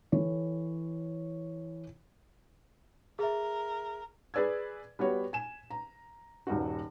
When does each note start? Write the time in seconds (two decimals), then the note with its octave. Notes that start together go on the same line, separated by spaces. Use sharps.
0.12 E3 A4 C#5
3.19 G#4 A#4 E5
4.34 G#4 B4 D5 E6 G#6
4.99 G3 B3 F#4 C#5
5.33 G#5 E7
5.70 A#5
6.47 D#1 G2 D#4 F#4